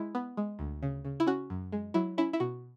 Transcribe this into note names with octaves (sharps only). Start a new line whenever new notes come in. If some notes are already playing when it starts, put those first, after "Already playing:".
Already playing: G#3 E4
B3
G#3
D2
C#3
C#3
E4
C#4 F#4
F#2
G#3
F#3 E4
C#4 E4
E4
B2 F#4